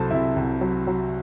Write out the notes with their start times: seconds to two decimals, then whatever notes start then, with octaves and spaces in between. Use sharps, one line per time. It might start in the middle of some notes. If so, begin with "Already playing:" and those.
Already playing: C2 F#3 A4 C5 A5
0.10 C3 E4 E5
0.36 C2
0.61 F#3
0.87 F#3